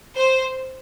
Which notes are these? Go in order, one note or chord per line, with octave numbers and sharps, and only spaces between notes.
C5